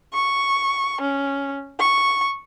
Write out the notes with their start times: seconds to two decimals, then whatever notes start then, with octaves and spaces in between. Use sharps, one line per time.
0.13 C#6
1.01 C#4
1.79 C#6